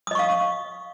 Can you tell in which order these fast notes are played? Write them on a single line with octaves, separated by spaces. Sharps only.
D#6 D#5 C#6 F5